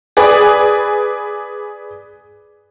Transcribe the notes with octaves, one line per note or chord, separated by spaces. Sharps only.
G#4 B4 D5